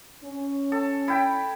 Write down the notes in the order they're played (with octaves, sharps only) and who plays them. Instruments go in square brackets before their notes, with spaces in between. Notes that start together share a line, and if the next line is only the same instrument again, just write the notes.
[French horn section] C#4
[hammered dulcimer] A4
E4 G5 B5